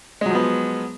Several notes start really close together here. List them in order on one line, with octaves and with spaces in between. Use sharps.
G#3 F#3 F3 B3